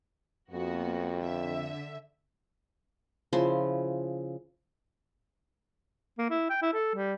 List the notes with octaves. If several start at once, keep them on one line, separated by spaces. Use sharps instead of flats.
F2 A#3 B3 F#4
D3 E5
C#3 F3 E4 C6
A#3
E4
G5
E4
A4
G3